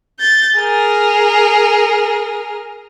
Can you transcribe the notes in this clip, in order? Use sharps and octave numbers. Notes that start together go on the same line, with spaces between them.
G6 A6
G#4 A#4